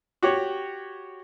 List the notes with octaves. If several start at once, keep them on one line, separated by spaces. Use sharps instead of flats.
F#4 G4 C#5